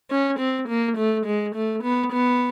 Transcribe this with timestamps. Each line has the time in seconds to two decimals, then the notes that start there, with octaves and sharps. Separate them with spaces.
0.10 C#4
0.39 C4
0.68 A#3
0.97 A3
1.26 G#3
1.55 A3
1.84 B3
2.12 B3